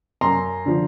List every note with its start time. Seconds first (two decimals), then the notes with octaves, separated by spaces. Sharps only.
0.21 F#2 A#5 C6
0.66 D3 F3